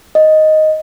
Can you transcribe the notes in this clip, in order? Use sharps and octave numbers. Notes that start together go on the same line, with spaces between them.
D#5